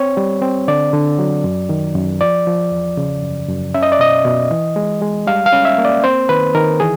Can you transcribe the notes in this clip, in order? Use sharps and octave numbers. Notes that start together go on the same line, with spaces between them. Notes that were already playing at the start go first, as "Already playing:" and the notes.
Already playing: C4 C#5
G3
C4
D3 D5
D3
F#3
F#2
D#3
F#2
F3 D5
F3
E2
C#3
F#2
F#2
C#4 E5
D#5
D5
B2 D#5
B2
E3
G#3
G#3
G3 F5
F5
C#4
E5
A#3
D5
C4 C5
D#3 B4
D#3 A#4
E3 G#4